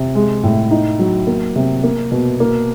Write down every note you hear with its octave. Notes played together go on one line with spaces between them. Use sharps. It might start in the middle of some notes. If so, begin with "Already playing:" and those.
Already playing: C3
G#3
A2
D#4
F#3
A#3
C3
A#3
B2
A#3